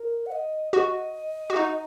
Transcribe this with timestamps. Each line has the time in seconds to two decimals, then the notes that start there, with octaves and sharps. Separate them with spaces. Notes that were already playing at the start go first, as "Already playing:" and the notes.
Already playing: A#4
0.26 F#5
0.32 D#5
0.73 F#4 D#5
1.50 F#4
1.56 D#4